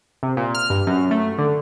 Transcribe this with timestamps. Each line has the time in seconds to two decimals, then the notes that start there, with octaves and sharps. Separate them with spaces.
0.23 C3
0.37 A#2
0.55 F6
0.70 G2
0.87 F#2
1.11 A3
1.38 D3